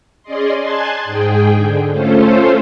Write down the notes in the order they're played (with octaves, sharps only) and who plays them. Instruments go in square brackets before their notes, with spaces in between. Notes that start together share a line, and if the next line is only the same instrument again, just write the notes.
[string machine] C#4 G#4 D5 D#5 C6
G#5 A5 C6 F#6 G#6 A6
G#2 G#4 G5
D3
A3 C#4 F4 A4 C5